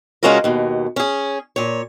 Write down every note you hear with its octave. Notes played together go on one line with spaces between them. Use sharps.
C#3 G#3 C#4 F4 F#4 A#4
D#2 B2
C#4 G#4
A#2 C#5